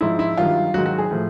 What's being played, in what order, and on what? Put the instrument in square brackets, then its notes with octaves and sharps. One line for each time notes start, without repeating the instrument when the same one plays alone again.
[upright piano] G#2 F3 E4
E4
G2 D#3 F#3 F4
G#2 D#3 F#3 F#4
F#4
G#4
A2 F3